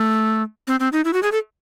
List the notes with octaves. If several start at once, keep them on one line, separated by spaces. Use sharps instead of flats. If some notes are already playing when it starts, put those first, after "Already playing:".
Already playing: A3
C4
C4
D#4
E4
F#4
G#4
A4